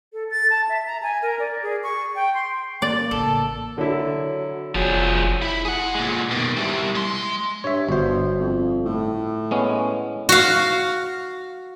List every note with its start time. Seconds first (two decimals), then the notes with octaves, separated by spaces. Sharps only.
0.13 A4
0.31 A6
0.50 A5
0.69 E5
0.86 A#5
1.02 G#5
1.22 A#4
1.39 D5
1.63 G#4
1.83 C#6
2.15 G5
2.34 C6
2.82 A#3 D5
3.11 A1 C#3 A4
3.78 D3 F#3 E4
4.75 F1 F3 F#3 G#4
5.42 E4
5.65 G#4 F#5
5.95 A#2 G#3
6.31 B2 D#3
6.57 G3 E4
6.95 G#3 C6
7.64 G2 C#5 E5
7.89 G1 B2 C5
8.40 F2
8.86 A2
9.51 G#3 B3 C#4
10.29 F#4 F5